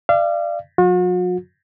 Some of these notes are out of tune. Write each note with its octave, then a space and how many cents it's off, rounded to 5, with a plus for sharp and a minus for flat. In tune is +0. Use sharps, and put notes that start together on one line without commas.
D5 +20 F5 -35
F#3 -40 F#4 -45